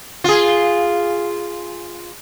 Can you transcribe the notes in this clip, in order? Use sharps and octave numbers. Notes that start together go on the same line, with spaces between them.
F4 G#4